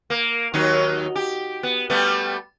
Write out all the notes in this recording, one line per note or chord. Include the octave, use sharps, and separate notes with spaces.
A#3
D#2 F#3 D#4
G4
B3
G3 A3 B3